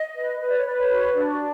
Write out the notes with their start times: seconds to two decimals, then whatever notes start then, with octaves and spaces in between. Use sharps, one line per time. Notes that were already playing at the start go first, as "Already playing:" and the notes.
Already playing: D#5
0.15 B4
0.40 B4 D#5
0.49 D5
0.58 C#5
0.65 B4 D5
0.78 C#5
0.90 F#4
1.15 D4 D5